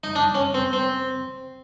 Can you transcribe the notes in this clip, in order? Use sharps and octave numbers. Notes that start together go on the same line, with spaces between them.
D#4
D4
C#4
C4
C4